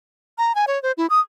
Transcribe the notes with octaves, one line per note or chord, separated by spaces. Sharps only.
A#5
G#5
C#5
C5
E4
D#6